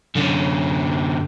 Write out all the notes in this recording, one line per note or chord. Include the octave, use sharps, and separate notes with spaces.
F#2 D3